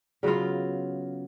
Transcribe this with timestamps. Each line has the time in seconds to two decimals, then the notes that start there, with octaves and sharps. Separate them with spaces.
0.23 C#3 F#3 B3 F4